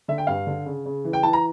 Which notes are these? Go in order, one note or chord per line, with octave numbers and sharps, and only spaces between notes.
D3 E5
G5
G2 F5
D3
C#3
C#3
E3
G5
E3 A5
A#5